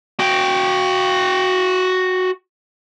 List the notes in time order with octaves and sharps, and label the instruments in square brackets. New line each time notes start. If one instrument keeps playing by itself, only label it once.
[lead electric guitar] F#4 G5